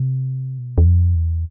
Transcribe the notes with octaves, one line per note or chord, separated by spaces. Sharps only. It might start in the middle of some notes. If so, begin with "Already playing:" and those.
Already playing: C3
B2
E2
F2
E2